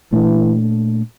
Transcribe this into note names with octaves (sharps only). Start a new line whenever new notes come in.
A#2 E3 A3 D4